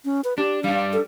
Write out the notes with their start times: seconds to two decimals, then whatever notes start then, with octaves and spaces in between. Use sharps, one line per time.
0.05 C#4
0.24 B4
0.38 D4 G4
0.64 G3 D4 F5
0.93 A4